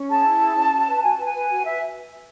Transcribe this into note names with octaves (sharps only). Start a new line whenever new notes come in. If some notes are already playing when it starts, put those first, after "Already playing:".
Already playing: C#4
G#4 A5
E4
G#4
C#4
F#4
B4
F#4 G#5
B4 A5
G#5
B4
F#4
B4 E5